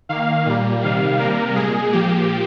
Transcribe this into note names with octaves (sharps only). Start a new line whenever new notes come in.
D#3 A#3 F5
A#2 G3 A#3
C3 D#3 G3 F5
C3 G3 A#3 A#4
A#2 G#3 G#4
A#2 F3 A#3 G4